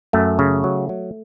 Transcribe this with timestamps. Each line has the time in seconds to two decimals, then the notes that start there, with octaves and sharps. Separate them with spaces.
0.13 F#2 A3
0.39 C#3
0.64 F#3
0.89 F#3